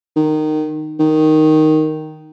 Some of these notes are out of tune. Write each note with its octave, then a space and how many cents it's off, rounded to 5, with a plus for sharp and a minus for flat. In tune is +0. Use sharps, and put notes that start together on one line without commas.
D#3 -15
D#3 +0